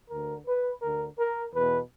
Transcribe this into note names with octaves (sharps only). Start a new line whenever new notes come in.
D2 D3 A#4
B4
D2 D3 A#4
A#4
E2 B2 B4